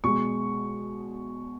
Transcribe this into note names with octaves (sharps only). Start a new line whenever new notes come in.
B2 G#3 C#6